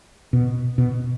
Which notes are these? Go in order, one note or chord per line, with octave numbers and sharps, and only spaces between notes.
B2
B2